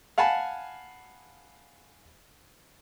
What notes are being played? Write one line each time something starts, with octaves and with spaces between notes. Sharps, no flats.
F5 F#5 G#5 A5 B5